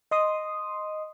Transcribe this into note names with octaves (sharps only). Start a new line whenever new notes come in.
D#5 C6 D#6